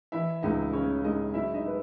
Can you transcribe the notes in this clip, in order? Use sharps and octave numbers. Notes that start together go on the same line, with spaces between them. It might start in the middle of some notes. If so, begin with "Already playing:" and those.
E3 E4 E5
C#2 D#4 D#5
C#3 C#4 C#5
G#3 D#4 D#5
F#3 E4 E5
D#4 D#5
B4